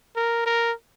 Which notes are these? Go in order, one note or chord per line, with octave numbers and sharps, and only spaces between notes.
A#4
A#4